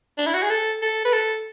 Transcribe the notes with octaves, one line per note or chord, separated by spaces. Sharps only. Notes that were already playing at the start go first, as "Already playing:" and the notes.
D4
E4
F#4
G#4
A4
A4
B4
A4